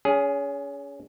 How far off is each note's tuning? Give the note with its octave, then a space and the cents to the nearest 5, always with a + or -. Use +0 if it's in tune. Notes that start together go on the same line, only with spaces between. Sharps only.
C#4 +30 G#4 +0